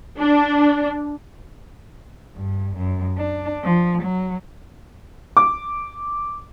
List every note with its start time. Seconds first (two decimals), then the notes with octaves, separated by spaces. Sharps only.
0.18 D4
2.36 G2
2.76 F#2
3.18 D4
3.64 F3
4.02 F#3
5.37 D6